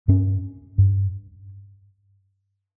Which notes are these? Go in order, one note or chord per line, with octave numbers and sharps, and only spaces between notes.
G2 C#4
G2